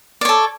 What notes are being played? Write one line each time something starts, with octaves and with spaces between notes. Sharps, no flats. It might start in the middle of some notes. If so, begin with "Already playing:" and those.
A4 C#5 D5